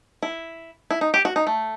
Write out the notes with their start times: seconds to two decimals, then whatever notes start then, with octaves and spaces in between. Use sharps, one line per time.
0.23 E4
0.91 E4
1.01 D#4
1.14 G4
1.25 F#4
1.36 D#4
1.47 A3